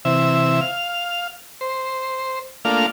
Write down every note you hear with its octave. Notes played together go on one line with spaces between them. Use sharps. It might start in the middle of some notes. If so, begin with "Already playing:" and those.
C3 E3 E5
F5
C5
A3 A#3 D4 F4 F5